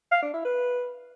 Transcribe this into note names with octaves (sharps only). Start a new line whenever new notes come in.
F5
D4
E4
B4